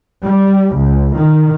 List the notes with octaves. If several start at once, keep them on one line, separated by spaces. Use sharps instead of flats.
G3
C#2
D#3